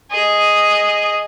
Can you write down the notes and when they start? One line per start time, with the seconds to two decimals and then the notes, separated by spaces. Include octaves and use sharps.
0.11 G#4 D#5